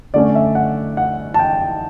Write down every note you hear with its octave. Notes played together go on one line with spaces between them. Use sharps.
D3 A3 C#4 D5
E5
F#5
F#5
A5
G5